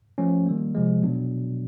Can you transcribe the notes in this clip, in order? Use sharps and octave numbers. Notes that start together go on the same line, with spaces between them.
F3 A3 C#4
D#3 G3 A#3
C3 F3 G#3
B2 F#3 B3 D4